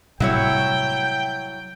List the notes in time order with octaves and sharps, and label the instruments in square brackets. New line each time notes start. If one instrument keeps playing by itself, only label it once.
[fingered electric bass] A2 C3 G3 [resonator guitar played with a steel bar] F#3 E4 C#5 [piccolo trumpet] G5